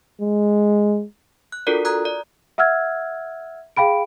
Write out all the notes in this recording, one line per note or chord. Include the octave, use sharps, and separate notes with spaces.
G#3
F#6
D4 F4 F#4 A4 A#4 D5
A#5 D#6 F#6 G#6
D5
E5 F#5 E6 F6 G#6
G#4 F5 G5 B5 D7